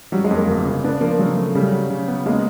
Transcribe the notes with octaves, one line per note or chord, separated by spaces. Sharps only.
F#3 G3
G#3
F2
A#3
G1
C#3
B3 D4
F3 A#3
C#3 F#3
A3
C#3 G3
F#3
C#3
B3
G#3 A#3